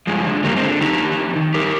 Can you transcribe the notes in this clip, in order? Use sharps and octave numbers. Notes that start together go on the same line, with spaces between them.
G2 F3 G#3
D3
G2 G3 A#3
G#3 C4
D3
F2 D#4 G4
D#3
F2
D#3
G2 G4 A#4